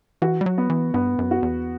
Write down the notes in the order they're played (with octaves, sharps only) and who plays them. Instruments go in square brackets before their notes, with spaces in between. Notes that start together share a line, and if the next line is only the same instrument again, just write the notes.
[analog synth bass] E3 [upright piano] F#4
[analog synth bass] G3
F#3
[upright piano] B3
[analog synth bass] E3
[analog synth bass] G2 [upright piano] B3
[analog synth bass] F#2
[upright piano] F#4
[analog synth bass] E2